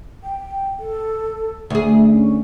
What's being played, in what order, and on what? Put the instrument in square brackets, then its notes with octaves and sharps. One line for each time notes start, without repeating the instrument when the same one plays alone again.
[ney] G5
A4
[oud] D2 G#4 [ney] E5
[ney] C#4